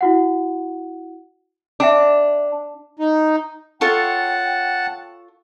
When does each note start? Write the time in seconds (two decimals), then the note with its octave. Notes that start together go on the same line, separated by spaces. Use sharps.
0.01 E4 F#4 F#5
1.80 D4 E5 G5 D6
2.99 D#4
3.81 F4 A4 C#5 F#5 G5 A5